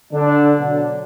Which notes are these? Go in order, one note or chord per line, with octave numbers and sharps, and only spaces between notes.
D3 D4
B2 F#3